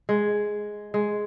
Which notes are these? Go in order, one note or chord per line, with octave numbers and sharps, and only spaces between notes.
G#3
G#3